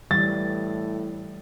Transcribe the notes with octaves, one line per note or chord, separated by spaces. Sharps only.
A2 E3 G3 A6